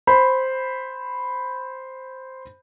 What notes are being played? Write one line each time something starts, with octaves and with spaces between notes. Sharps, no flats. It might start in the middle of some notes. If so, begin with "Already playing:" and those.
C5 B5